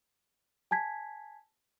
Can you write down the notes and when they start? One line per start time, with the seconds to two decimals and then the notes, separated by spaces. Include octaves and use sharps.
0.71 G#5 A5 G#6 B6